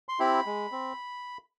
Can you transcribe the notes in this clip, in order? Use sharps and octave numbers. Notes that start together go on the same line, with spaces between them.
C6
C4 E4 G4 B5
G#3
C4